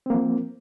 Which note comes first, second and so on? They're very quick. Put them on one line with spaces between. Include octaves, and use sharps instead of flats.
C4 A#3 F3